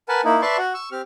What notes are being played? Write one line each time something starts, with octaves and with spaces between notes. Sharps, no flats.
A#4 B4 F#5 G#5 A5
A#3 D#4 E4
B4 D5 E5 A5 C6 C#6
F#4 F#5
C#6 E6
C4 G4 F6